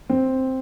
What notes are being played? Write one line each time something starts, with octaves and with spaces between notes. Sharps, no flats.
C4